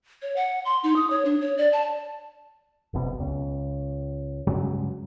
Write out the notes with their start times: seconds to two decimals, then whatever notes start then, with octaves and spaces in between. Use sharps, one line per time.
0.22 C#5
0.36 F#5
0.65 C6
0.83 D#4
0.96 D#6
1.10 C#5
1.25 D4
1.41 C#5
1.58 D5
1.73 A5
2.93 F#1 C2 B2
3.20 C#2
4.47 G2 C#3 F#3 G#3